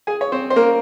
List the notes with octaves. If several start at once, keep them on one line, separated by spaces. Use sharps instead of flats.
G#4 G#5
C#5
C4 C5
C5
A#3 A#4